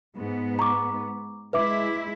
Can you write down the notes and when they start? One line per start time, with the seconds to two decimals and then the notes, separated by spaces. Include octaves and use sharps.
0.16 G#2 B3
0.59 A#5 C#6 D6
1.53 G#3 E4 B4 E5 D6